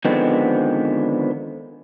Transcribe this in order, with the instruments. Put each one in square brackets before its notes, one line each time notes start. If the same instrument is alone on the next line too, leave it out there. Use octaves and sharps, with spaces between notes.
[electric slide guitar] D3 D#3 F3 G#3 B3 C4